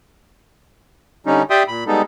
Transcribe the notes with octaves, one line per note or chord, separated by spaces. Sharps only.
D3 G3 C#4 D#4
G4 D5 E5 G5 C6 D#6
A#2 B5
G3 G#3 B3 D#4 A4